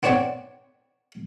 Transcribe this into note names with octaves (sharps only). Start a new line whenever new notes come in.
B3 C4 D4 C#5 D5 F#5